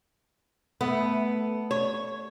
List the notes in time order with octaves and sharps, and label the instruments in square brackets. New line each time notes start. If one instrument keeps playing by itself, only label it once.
[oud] A3 [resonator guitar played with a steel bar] B3
[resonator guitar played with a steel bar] C#5